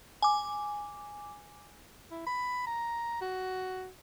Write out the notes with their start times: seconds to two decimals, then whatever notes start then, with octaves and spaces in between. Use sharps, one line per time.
0.22 G#5 D6
2.11 E4
2.26 B5
2.67 A#5
3.21 F#4